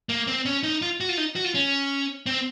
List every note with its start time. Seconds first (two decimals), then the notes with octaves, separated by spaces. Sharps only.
0.09 A#3
0.27 C4
0.45 C#4
0.64 D#4
0.82 F4
1.00 F#4
1.09 F4
1.18 D#4
1.36 F#4
1.44 F4
1.54 C#4
2.26 C4